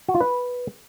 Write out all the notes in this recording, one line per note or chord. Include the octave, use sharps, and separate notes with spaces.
F#4
F4
B4